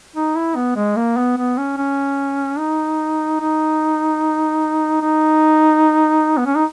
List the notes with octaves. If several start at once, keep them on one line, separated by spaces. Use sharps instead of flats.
D#4
E4
B3
G#3
A#3
B3
B3
C#4
C#4
D#4
D#4
D#4
B3
C#4
D#4